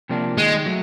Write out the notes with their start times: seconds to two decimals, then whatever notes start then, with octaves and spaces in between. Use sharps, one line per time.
0.09 C3 F3 A#3 D4
0.37 D#3 G#3
0.66 F#3 A3